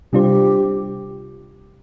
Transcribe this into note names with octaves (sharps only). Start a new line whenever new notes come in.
C3 G3 D4 F4 G4 C5